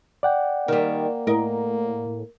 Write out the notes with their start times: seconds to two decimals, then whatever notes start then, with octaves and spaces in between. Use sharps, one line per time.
0.23 D5 F#5 G5
0.68 D#3 G3 A#3
1.27 A2 A#4 D#5